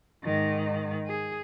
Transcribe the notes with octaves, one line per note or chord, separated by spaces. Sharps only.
G#2 D#3
G#4